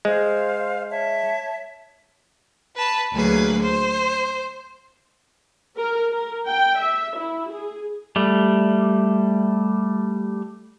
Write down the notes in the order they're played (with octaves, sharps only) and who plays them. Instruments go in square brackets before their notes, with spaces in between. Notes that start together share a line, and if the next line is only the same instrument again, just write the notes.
[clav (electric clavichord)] G#3 [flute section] C5 F5
[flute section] C#5 E5 A5
[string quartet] B4 A5
D2 F#3 A#3 G#4 B4
C5
[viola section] A#4
A#4
G5
E5
E4
G#4
[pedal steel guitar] G3 A3